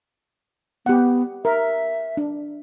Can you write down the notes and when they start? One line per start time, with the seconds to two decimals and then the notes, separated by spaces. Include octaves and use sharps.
0.86 B3 G4 F#5
1.45 A#4 E5
2.17 D4